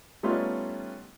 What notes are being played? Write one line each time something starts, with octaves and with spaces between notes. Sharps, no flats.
G3 A3 B3 C#4 D#4 F4